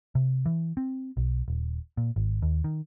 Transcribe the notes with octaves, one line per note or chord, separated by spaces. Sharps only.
C3
E3
C4
B1
D#1
A#2
G#1
D#2
D#3